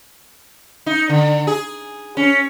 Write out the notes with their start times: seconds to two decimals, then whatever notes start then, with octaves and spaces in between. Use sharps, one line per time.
0.86 D#4
1.09 D3
1.47 G#4
2.17 C#4